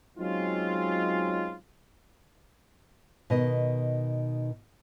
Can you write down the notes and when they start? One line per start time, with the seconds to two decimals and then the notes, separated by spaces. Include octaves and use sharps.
0.17 F#3 G#3 C4 C#4 D#4 F4
3.30 B2 D#3 D#5